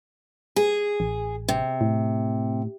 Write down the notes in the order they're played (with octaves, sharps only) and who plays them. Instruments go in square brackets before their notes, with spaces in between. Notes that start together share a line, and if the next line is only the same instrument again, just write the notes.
[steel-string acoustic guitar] G#4
[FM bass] A1
[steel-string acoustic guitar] C3
[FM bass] A2